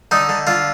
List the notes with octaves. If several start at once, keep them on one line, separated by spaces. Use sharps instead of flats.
D3 D#4
D3
D3 F4